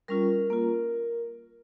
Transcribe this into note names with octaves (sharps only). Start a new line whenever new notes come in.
G3 C#4 F4 A#4
A#3 F4